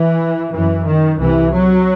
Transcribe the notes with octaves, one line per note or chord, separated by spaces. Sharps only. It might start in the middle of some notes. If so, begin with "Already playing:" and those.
Already playing: E3
F#2 E3
D#3
C2 C3 E3
F#3